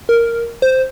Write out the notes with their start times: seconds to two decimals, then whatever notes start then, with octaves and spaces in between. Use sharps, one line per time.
0.09 A#4
0.62 C5